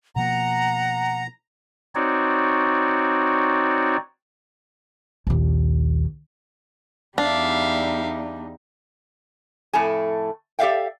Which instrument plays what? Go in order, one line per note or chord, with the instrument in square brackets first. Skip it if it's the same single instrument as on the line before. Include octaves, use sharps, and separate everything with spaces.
[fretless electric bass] B2 F3 A#3 [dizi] F#5 [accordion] A#5
[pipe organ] C4 D#4 F#4 C#5 D5
[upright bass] A#1 D#2
[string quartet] E2 G3 D#4 [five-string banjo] D4 [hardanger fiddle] E5 F5
[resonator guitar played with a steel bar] F2 A2 A3 A4 G#5
G4 A4 D5 E5 F5 G5